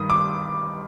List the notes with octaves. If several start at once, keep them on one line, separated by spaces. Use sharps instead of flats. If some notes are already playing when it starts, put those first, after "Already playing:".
Already playing: G2 D#3 D#6
D6